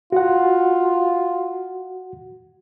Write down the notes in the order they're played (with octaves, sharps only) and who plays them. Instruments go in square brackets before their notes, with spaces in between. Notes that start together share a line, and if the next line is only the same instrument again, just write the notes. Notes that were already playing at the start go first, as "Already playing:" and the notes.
[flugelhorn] F4 [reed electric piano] F#4 F#5